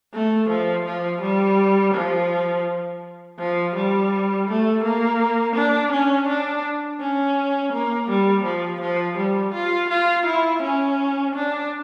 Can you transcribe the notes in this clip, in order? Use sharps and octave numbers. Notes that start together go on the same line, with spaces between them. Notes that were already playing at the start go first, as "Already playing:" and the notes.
A3
F3
F3
G3
F3
F3
G3
A3
A#3
D4
C#4
D4
C#4
A#3
G3
F3
F3
G3
F4
F4
E4
C#4
D4